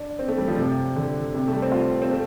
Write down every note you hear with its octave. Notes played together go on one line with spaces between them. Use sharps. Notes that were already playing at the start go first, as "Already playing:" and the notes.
Already playing: D4
C4
A3
G3
F3
C3
D3
C3
A3
G3
C4
F4
C4
A3